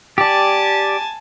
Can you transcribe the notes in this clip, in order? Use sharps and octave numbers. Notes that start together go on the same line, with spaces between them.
G4 D5 G#5 A5